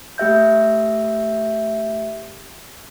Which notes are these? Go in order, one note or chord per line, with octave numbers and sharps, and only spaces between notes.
A3 G4 E5 G6